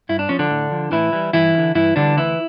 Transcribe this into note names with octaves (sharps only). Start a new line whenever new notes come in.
G2 E4
D4
F3 C#4
D3 D4
A2
F3
A2 E3 E4
E3 G3
G2 E3 E4
F3
D3
G2 E3 E4
D3 E3 G3 D4
D2 E3 E4